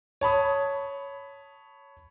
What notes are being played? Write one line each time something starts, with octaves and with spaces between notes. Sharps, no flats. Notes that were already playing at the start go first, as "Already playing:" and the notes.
C#5 A5 B5 D#6